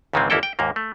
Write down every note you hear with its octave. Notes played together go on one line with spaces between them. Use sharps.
C#2 G#2 D#3 E3 G#3 C4
G1 D#2 A#3 E4 A4 G5
G5
D#2 G#2 A#3
A3